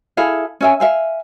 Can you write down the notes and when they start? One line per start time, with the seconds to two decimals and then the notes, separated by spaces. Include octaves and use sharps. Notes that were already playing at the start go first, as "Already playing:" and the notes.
0.17 E4 G#4 A4 F5
0.61 C#4 E5 G#5
0.80 E5 F5 G#5